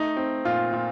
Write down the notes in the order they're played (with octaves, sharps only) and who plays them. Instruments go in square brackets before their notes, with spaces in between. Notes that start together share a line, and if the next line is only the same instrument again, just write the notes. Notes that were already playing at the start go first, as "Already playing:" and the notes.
Already playing: [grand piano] A3 [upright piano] D#4
[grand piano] C4
[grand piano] A#2 [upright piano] F4
[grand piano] A#2